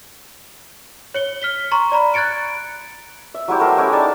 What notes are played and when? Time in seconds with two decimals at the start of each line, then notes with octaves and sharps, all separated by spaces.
1.14 C#5 C#7 G7
1.42 F6 B6 G7
1.72 A#5 C6 C#6
1.92 D5 A#5 B5
2.14 F#6 G#6 A6 C#7 D7
3.34 E5
3.48 F#3 G#3 E4 G4
3.60 A3 A#4 C5 E5
3.77 G#3 C#4 E4 G4
3.93 D#4 D5 G#5 A5